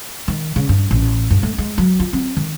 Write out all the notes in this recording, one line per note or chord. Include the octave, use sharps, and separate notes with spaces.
D#3
C#3
G2
A1
G2
A3
G#3
F#3
F4
C4
D#3